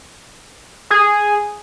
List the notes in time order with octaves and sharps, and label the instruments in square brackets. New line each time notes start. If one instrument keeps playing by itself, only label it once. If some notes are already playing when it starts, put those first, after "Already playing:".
[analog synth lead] G#4